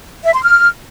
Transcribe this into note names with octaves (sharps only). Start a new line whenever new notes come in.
E5
C6
F6